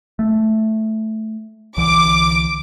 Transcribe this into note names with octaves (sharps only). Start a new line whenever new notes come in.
A3
C2 D3 E3 D6